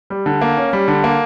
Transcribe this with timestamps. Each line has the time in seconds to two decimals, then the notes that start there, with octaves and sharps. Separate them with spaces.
0.10 G3
0.26 D3
0.41 A#3
0.57 C#4
0.73 G3
0.88 D3
1.04 A#3